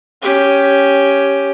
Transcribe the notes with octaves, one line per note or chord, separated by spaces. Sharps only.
C#4 G4